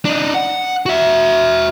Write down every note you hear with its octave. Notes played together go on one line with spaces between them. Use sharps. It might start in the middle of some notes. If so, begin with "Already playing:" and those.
D4 D#4
F#5
F#4 E5